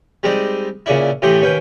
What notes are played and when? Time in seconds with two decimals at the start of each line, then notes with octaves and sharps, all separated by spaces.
0.23 G3 G#3 C4 D#4 D5
0.86 A#2 C#3 D4 E4
1.22 A2 E3 A3 G4 D#5 C6
1.42 D#2 C#4 B4 G5